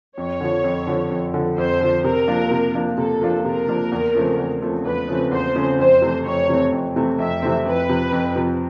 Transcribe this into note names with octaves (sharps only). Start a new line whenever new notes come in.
F2 C#5
D3 F3
F2
D3 F3
F2
D3 F3
F2 C5
D3 F3
C3 A#4
F3 A#3 D4 F4
C3
F3 A#3 D4 F4
C3 A4
F3 A#3 D4 F4
C3 A#4
F3 A#3 D4 F4
E2
C#3 F3 A3 C4
E2
C#3 F3 A3 C4
E2 B4
C#3 F3 A3 C4
E2 C5
C#3 F3 A3 C4
F2 C5
C3 E3 A3 C4
F2 C#5
C3 E3 A3 C4
F2
C3 E3 A3 C4
F2 E5
C3 E3 A3 C4
F2 B4
C3 F3
F2
C3 F3